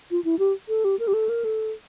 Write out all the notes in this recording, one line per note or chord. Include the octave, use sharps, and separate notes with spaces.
F4
E4
G4
A4
G4
A#4
G4
A4
A#4
A4